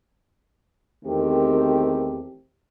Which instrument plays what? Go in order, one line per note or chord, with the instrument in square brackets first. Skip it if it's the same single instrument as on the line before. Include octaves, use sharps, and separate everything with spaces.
[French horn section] E2 D#3 A3 C4 G4 A#4